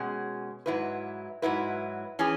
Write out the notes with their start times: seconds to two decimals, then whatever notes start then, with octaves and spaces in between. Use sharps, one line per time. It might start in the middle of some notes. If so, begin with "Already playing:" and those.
Already playing: B2 G#3 C#4 G#4
0.66 G#2 F#3 E4 B4
1.42 G#2 F#3 E4 B4
2.19 E3 C#4 G#4